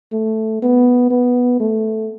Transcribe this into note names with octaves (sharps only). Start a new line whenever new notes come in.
A3
B3
B3
A3